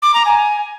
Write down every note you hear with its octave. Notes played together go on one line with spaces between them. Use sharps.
D6
A#5
G#5